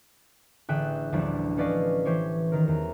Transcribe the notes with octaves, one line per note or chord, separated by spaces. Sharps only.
A1 D3 G#4 E5 G5 F#6
A1 D2 F3 G3 D4
G3 C#4 B4 D5 D#5 F5
E3 G4 C5 C#5
D#3 A#4
E2 A#5